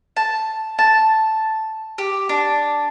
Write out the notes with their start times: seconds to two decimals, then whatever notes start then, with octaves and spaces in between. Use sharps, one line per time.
0.16 A5
0.79 A5
1.98 G4
2.29 D4